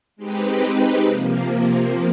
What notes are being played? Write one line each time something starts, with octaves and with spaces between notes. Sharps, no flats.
G#3 C4 D#4 G4 B4
C3 F3 A#3